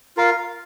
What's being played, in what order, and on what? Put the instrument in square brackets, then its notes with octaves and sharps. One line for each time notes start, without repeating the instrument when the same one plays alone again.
[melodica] F4 A#4 F5